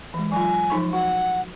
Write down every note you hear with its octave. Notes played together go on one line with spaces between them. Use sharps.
E3 G#3
F#3 F4 G#5
F3 D#4 C#6
F#4 F#5